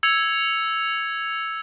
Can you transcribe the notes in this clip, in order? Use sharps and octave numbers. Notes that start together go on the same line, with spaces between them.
E6 G#6 C#7 F7